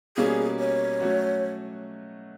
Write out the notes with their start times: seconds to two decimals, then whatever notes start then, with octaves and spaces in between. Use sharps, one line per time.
0.17 B2 G3 A#3 C#4 G#4
0.59 C#5
1.00 F#3 A3 C#4 F#4